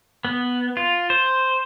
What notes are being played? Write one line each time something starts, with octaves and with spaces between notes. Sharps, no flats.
B3
F4
C5